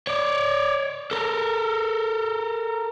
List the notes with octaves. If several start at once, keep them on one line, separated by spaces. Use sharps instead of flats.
C#5 D5
A4 A#4